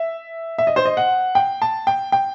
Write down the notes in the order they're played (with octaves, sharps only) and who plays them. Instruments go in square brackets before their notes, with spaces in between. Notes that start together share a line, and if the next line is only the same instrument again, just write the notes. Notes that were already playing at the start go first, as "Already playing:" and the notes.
Already playing: [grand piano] E5
E5
D#5
C5
D#5
F#5
G5
A5
G5
G5